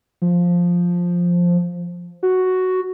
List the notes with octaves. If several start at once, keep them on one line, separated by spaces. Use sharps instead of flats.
F3
F#4